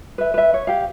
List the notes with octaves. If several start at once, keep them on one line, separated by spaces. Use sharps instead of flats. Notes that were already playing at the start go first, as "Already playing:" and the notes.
B4 E5
B4 E5
C#5
G4 F5